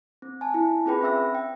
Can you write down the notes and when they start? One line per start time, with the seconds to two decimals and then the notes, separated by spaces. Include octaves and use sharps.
0.22 C4
0.41 G#5 A5
0.54 E4
0.86 C4 F4 G#4 B4 G5 B5
1.01 C4 C#4 E5 E6 A#6
1.35 G5